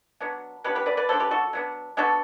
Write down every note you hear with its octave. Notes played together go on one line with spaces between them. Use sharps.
F#3 B3 D4
F#3 B3 D4 G4 B4
G4 B4
B4 D5
B4 D5
F#3 B3 D4 A4 C5
G4 B4
F#4 A4
F#3 B3 D4
F#3 B3 D4 F#4 A4